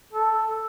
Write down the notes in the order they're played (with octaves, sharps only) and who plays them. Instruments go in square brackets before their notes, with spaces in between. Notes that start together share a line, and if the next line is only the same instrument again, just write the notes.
[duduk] A4